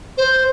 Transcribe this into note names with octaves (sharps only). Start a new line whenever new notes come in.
C5